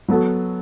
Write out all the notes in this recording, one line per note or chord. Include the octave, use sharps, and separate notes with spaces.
F#3 B3 F#4 A4